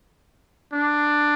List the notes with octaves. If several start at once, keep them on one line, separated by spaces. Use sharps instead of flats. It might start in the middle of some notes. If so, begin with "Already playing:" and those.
D4